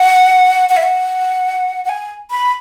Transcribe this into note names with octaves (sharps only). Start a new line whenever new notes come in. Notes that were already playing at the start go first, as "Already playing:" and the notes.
Already playing: F#5
F#5
E5
F#5
F#5
G#5
B5